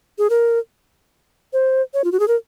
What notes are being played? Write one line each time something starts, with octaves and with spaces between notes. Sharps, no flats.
G#4
A#4
C5
C#5
F4
F#4
G#4
A#4